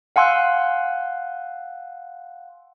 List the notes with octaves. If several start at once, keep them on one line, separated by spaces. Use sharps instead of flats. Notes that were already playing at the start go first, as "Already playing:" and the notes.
F5 F#5 G#5 C6 E6 F#6